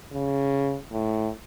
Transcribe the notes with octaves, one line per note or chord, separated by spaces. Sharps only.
C#3
A2